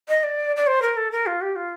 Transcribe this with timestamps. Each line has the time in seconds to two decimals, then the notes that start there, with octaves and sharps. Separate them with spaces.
0.08 D#5
0.23 D5
0.56 D5
0.67 C5
0.82 A#4
0.97 A4
1.11 A#4
1.26 F4
1.41 G4
1.56 F4